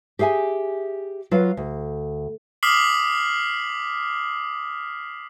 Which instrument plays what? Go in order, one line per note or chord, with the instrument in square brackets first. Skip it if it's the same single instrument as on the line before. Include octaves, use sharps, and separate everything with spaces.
[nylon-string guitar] G4 G#4 E5 F5 G#5
F#3 F4 B4 F5
D2
[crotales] D6 D#6 F6 B6 C7 F#7